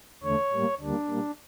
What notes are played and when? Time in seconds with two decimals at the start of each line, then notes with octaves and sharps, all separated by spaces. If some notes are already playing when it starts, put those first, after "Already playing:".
0.24 E2 D3 A3 C#5
0.52 A2 G3 A#3
0.81 D2 D3 G3 A#3 D4
1.08 A#2 G3 A#3